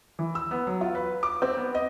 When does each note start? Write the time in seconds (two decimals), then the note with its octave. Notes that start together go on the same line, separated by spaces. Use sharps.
0.19 E3
0.35 E6
0.51 B3
0.67 F#3
0.81 F4
0.95 B4
1.23 D6
1.42 C4
1.57 B3
1.75 D#5